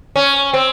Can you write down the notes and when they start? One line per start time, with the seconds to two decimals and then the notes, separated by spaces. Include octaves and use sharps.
0.16 C#4
0.54 C4